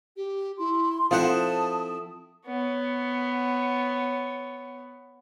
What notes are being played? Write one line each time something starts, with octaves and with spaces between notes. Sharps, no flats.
G4
E4 C6
F3 C4 E4 A4 F#5 A5 D#6
B3 C#5